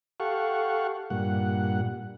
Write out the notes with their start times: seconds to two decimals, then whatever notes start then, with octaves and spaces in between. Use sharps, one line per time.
0.20 G4 A4 F5 F#5 C#6
1.10 G2 A#2 F#5